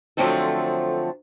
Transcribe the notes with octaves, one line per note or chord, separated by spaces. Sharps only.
D3 F3 F#3 A3 C4 A4